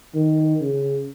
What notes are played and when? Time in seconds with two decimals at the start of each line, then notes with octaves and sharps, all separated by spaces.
0.15 D#3
0.61 C#3